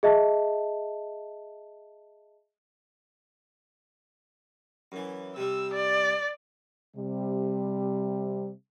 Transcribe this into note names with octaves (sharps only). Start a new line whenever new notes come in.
G#4 D#5 E5 A5
F#2 E3
C3 G3 E6
D5
C3 G3